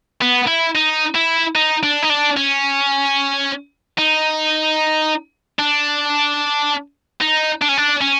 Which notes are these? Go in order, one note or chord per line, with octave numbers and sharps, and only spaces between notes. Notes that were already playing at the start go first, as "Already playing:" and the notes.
B3
E4
D#4
E4
D#4
D4
D#4
D4
C#4
D#4
D4
D#4
D4
C#4
D4
C#4